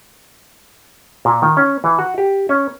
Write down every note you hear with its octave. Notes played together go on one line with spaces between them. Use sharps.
A#2
D#3
C#4
E3
F#4
G4
C#4